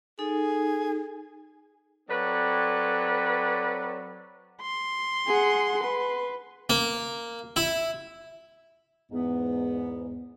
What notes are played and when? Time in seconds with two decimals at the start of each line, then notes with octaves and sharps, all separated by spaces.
0.19 D#4 G#4 A4
2.10 F#3 C4 A4 B4 C#5 D5
4.62 C6
5.27 G#4 F#5
5.84 B4
6.70 A#3
7.56 E4
9.11 E2 G#2 B3